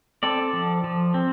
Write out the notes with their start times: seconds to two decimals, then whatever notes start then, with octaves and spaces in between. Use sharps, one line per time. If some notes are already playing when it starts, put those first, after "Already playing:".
0.23 C4 A4 D5
0.53 F3
0.84 F3
1.14 C4